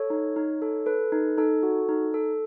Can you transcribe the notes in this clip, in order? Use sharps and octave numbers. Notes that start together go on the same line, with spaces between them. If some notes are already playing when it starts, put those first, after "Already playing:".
Already playing: A4 C#5
D#4
D#4
A4
A4 B4
D#4
D#4 A4
F#4
D#4
A4